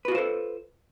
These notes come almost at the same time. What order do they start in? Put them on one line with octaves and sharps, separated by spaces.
B4 F#4 F4 C5 A4